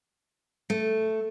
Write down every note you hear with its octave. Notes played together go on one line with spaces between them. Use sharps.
A3